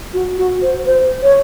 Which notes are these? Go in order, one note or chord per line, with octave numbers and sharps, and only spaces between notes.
F#4
F#4
C5
C5
C#5